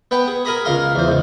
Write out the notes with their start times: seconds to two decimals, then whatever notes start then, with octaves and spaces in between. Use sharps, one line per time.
0.11 B3 B4 G5
0.28 G#4
0.45 G#4 A#4 G#5 A#5 B5 D#6
0.65 C#2 A#4 F5 C6
0.95 E2 C5
1.08 C#2 G#2